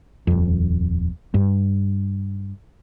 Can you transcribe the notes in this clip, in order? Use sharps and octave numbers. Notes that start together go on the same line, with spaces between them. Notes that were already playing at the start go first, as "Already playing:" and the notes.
D#1 F2
G2